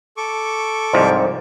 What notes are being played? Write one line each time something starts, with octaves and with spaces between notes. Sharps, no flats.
A4 C#6 D6
C2 G#2 F3